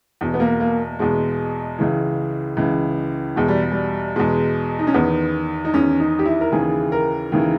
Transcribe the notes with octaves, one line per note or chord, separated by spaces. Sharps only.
E2 B2
B3
A#3
A#3
E2 B2 G#3
C#2 C#3 E3
C#2 C#3 E3
E2 B2 G#3
G3
G3
E2 B2 G#3
D#4
C#4
E2 D#3 B3
D#4
E2 D#3 C#4
D#4
G4
E4
A#4
D#2 C#3 E3 G#4
A#4
D#2 C#3 E3